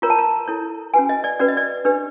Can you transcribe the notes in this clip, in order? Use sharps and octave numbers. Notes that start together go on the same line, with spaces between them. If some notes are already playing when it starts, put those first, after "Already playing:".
F4 A#4 C#5 A#5
A5
A#5
E4 A4 C#5
C#4 F#4 B4 G#5
D#5
D5
C#4 F#4 B4 D5
D#5
D5
D4 G4 B4